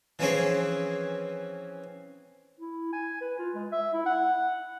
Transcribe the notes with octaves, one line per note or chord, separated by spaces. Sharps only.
E3 F3 C4 C#4 G#4 C5
E4
G#5
B4
F4
G#3
E5
E4
F#5